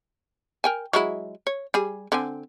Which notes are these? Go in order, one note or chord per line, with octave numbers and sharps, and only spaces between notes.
A#4 G5 G#5
F#3 G#3 E4
C#5
G3 G#4
D3 C4 G#5